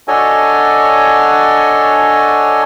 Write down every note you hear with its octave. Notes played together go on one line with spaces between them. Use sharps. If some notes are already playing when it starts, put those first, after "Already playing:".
D4 F#4 A4 C#5 D#5 G#5